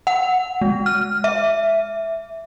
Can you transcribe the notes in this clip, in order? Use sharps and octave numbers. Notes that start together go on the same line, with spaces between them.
F#5
G#3
F6
E5